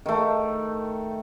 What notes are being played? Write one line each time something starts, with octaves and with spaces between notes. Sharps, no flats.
D#3 A3